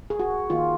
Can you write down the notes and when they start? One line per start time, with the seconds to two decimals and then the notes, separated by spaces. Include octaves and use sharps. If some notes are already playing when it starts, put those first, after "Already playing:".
0.10 G#4
0.20 F#4
0.50 D#3 A#3 F4